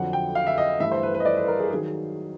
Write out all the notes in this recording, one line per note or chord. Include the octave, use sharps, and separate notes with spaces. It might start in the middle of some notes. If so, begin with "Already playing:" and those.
Already playing: F2 D3 F#3 F#5
G5
F5
E5
D#5
G2 E3 A3 E5
C5
B4
B4
D#5
D5
B4
A#4
G#4
D#3 F#3 G#4